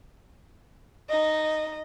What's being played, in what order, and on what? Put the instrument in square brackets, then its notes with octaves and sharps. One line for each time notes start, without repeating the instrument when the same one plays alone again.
[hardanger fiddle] D#4 [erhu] D#5